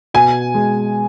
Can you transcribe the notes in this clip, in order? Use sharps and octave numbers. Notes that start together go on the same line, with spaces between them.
B2 G#5
G#3